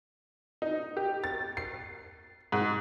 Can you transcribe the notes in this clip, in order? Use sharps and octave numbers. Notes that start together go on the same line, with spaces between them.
D#4
G4
A6
C7
G#2